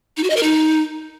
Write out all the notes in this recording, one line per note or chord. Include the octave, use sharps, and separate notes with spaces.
D#4
F#4
D#5
A#4
D#4